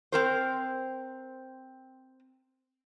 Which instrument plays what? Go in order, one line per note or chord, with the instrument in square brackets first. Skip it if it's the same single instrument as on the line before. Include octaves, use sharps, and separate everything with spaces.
[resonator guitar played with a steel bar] C4 A#4 C5